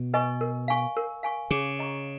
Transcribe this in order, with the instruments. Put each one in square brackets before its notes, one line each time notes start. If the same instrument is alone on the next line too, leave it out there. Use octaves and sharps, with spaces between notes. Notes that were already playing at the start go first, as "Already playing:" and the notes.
Already playing: [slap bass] B2
[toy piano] B4 D#5 G#5 C#6
A#4
F5 G#5 C#6
A#4
F5 G#5 C#6
[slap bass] C#3 [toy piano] G#4
[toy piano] D#5 A#5 C#6